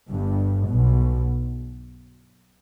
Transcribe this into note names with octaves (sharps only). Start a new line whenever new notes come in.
G1 G2
B1 B2